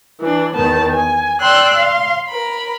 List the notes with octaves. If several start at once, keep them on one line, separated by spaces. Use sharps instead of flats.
E3 D4
E2 D#3 B3 A5
G#5
D5 G5 C6 E6 F#6
F5 C6
A#4 B5